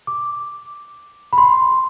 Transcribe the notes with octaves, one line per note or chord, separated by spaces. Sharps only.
D6
B5
C6